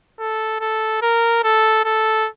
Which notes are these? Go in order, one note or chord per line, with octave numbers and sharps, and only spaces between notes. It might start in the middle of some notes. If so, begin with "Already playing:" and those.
A4
A4
A#4
A4
A4